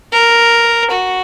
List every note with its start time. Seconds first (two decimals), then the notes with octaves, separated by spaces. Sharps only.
0.12 A#4
0.91 F#4